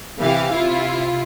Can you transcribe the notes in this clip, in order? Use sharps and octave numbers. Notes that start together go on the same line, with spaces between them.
C3 E3 G4 F5
C3 E4 F4